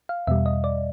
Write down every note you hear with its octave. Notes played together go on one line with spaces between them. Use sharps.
F5
E2 B2 G3 E5
D#5
D5